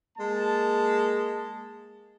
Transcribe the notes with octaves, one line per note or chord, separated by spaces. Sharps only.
G#3 A#3 A5